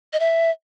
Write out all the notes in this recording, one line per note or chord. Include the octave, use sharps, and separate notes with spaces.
D#5
E5